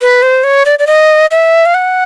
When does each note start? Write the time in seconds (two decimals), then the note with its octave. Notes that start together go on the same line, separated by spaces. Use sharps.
0.01 B4
0.22 C5
0.44 C#5
0.66 D5
0.79 D5
0.87 D#5
1.31 E5
1.66 F5
1.74 F#5